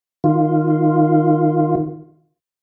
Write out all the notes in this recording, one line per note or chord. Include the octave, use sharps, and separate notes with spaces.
D#3 F4